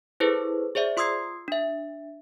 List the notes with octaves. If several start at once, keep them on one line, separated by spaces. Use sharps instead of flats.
E4 G#4 A4 B4 C5
G#4 C5 D5 E5
F4 C6 D#6 E6 G#6 C7
D4 E5